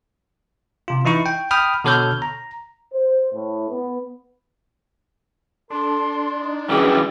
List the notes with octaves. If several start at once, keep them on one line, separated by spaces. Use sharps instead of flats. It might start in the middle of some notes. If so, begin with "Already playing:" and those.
C3 F4
E3 D#4 E4 C#6
G5
G5 B5 D#6 F6
B2 D3 A4 C#5 F6 G6
A#5
C5
A2
B3
D4 A4 C6
D#4
F#2 A2 E3 G3 G#4 B4 G5